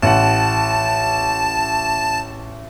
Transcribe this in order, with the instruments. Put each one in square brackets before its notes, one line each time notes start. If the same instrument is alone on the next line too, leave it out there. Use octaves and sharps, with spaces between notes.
[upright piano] A1 F#5 [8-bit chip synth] A5